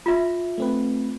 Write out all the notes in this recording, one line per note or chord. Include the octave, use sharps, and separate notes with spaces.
F4 E5
A3 C4 B4